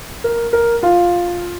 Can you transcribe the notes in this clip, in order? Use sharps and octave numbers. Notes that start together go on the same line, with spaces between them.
A#4
A#4
F4 F5